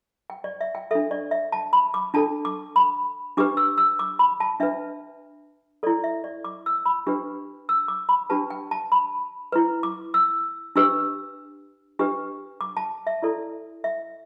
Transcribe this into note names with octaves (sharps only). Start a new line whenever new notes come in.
G5
D5
E5
G5
D4 A4 E5
D5
E5
A5
B5
D6
D4 A4 A5
D6
B5
D4 G4 B4 D6
E6
E6
D6
B5
A5
D4 B4 E5
E4 A4 D5
E5
D5
D6
E6
B5
D4 G4 B4
E6
D6
B5
D4 G4 B4 A5
G5
A5
B5
E4 B4
D6
E6
D4 G4 B4 E6
D4 G4 B4
D6
A5
E5
E4 A4 D5
E5